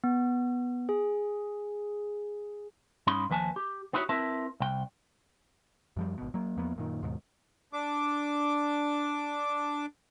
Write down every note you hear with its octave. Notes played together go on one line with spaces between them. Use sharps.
B3
G#4
G2 C#4 D#4 B5 C6
D#2 F3 B4 G#5 A5
G4
B3 D#4 E4 F#4 G4 C#5
C4 E4 A#4 B4 E5 A5
C2 G5
F#2 F3 G3
G#1 B2
F#3 A#3
E2 F3 A#3 B3
F#2 A#2 D#3
D#2 G#2 B2
D4 D6